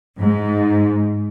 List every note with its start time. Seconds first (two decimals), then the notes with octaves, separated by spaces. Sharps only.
0.20 G#2